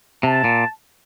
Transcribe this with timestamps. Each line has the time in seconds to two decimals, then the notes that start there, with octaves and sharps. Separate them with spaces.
0.23 C3 A5
0.44 A#2